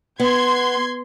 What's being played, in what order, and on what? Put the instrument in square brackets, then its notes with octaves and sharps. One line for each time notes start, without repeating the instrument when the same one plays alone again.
[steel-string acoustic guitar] B3 [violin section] C6 G#6